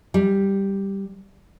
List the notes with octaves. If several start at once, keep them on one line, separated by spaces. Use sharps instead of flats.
G3